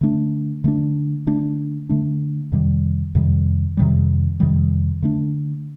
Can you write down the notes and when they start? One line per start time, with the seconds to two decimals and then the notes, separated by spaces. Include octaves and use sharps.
0.01 D3 A3 D4
0.64 D3 A3 D4
1.27 D3 A3 D4
1.89 D3 A3 D4
2.52 F2 C3 D#3 G3
3.15 F2 C3 D#3 G3
3.77 F2 C3 D#3 G3
4.40 F2 C3 D#3 G3
5.02 D3 A3 D4